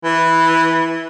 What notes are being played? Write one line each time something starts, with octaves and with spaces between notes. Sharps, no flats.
E3